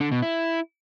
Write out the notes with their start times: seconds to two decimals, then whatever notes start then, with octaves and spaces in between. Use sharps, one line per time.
0.01 D3
0.12 B2
0.22 E4